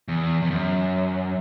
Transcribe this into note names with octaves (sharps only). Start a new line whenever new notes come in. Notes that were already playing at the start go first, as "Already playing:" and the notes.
E2
E2
F#2